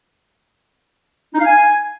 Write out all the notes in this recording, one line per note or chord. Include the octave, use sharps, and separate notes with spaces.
D#4
F5
G#5